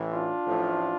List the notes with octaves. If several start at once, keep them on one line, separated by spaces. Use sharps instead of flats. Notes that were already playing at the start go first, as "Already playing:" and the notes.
Already playing: A1 A2 E3
D4 F4
A1 A2 F3 A3